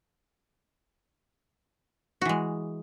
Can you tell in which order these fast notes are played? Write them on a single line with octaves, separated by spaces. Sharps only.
F#4 E3 G#3